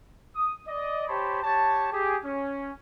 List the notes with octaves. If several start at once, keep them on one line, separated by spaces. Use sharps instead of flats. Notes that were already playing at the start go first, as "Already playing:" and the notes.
D#6
D5 D#5
G4 C5 C#5 A5 B5
G4 C#5 A5
G4 G#4
C#4